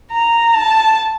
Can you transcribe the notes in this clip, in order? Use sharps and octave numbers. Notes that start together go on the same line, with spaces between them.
A#5
A5